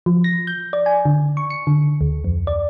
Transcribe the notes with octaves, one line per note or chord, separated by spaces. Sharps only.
F3
A#6
G6
D5
G#5
D3
C#6
C#7
D3
D2
F2
D5